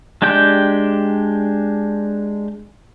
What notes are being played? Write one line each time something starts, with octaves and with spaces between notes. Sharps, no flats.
G#3 D4 G4 G5 G6